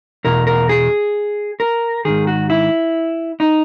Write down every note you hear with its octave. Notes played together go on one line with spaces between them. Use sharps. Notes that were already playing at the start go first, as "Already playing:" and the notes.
E2 B2 A#4
A#4
G#4
A#4
G#2 D#3 G#4
F#4
E4
D#4